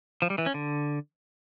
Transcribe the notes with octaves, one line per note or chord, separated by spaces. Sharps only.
F3
G3
E3
C#4
D3